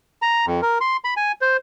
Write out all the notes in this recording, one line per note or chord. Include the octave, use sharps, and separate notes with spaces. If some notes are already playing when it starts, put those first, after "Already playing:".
A#5
F2
A#4
C6
B5
G#5
C5